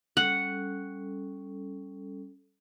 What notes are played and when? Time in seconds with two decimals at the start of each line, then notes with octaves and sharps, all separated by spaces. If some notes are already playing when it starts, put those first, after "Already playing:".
0.17 G3 C#4 A4 F#5